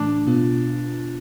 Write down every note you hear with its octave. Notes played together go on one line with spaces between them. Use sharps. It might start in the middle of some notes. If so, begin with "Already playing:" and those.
Already playing: A2 E3 A3 D4
B2 B3 F4